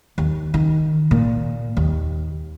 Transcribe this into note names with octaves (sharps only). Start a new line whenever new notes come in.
D#2
D#3
A#2
D#2